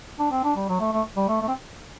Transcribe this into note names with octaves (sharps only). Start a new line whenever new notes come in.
D4
C4
D4
G3
F#3
A3
A3
G3
A3
A3
C4